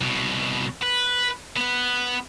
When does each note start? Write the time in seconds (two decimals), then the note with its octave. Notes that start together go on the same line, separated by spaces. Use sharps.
0.01 C2 B2
0.82 B4
1.57 B3 B4